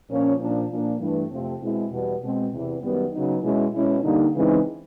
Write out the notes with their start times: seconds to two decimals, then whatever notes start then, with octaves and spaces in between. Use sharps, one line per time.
0.09 A#2 F3 A#3 C#4
0.40 A#2 F3 A#3 D4
0.71 A#2 F3 A#3 D4
1.00 G2 E3 A3
1.30 F2 C3 F3 A3 C4
1.62 B2 G#3 C4 E4
1.91 E2 B2 G3 B3
2.22 B2 G#3 C4
2.53 E2 C3 E3
2.82 F#2 D#3 G3 B3
3.13 C#3 F#3 B3 D#4
3.43 B2 G#3 C#4 E4
3.74 B2 G#3 C#4 E4
4.04 D3 G3 A#3 D#4
4.35 C#3 E3 G#3 C4 D#4